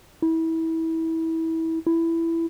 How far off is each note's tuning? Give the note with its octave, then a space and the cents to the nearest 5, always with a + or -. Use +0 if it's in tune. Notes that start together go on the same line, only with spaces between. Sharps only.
E4 -25
E4 +10